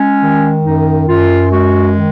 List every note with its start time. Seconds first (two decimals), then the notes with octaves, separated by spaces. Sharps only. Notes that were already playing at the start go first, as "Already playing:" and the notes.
Already playing: G#3 C#4
0.21 D#3
0.63 F#2 D#4
1.08 F#2 F4
1.50 G#3 F#4
1.95 D#3